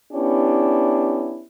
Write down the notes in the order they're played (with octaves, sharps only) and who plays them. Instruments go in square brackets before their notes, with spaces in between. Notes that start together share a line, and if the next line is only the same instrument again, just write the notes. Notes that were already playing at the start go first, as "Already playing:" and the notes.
[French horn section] B3 C#4 D4 E4 G4